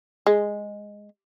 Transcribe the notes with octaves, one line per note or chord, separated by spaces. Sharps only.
G#3